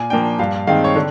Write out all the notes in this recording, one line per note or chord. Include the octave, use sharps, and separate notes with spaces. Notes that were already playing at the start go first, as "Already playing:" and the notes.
Already playing: A#2 G#5
F3 A#3 D4 G5
G2 F5
D#3 G#3 C4 F5
C#5
D3